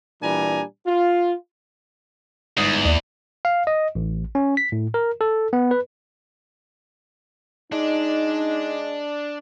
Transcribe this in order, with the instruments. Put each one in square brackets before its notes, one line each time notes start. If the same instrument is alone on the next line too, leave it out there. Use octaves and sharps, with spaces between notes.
[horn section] A#2 E3 G3 D4 G#5 A#5
F4
[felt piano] G1 G#2 D#6 [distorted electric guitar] E2
[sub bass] D#2 [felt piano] D5
[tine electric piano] F5
D#5
A1
C#4
B6
A2
A#4
A4
B3
B4
[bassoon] G#3 [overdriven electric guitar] D4 [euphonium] D#4